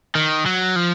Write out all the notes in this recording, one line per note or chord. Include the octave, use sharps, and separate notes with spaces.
D#3
F#3
F3